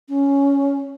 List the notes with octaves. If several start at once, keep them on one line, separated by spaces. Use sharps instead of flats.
C#4